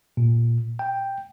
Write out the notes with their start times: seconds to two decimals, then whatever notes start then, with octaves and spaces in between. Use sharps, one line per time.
0.17 A#2
0.79 G5